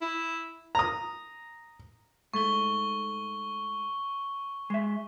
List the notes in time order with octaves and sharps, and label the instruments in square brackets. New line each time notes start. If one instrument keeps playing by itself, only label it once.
[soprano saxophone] E4
[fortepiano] A#5 D#6
[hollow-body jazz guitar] G#2 A3 [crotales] C#6 G7
[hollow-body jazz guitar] G#3 E5